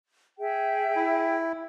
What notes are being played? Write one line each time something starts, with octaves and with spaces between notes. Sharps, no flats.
G#4 E5 G5
E4